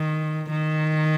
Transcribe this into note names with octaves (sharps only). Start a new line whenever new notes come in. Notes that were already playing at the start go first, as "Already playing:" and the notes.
Already playing: D#3
D#3